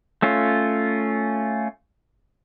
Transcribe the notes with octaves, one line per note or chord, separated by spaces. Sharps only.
A3 C#4 F4